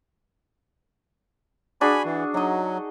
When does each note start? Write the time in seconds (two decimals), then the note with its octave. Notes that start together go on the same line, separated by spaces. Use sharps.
1.81 D4 F#4 G#4 G#5 B5
2.05 E3
2.34 F#3 D#4 D#5